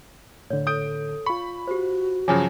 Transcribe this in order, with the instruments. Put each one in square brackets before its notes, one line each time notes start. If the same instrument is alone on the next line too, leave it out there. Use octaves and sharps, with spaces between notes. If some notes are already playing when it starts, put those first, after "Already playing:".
[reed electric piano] A2 D3 [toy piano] C#5
[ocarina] A4 [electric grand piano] D#6 G6 D7
[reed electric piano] F4 C#6 [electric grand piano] B5
[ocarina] F#4 [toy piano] G4 C5
[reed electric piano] G2 [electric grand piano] C#3 F3 F#3 [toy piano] C#5 G#5 D6